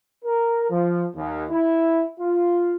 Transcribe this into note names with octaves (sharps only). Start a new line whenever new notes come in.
A#4
F3
D#2
E4
F4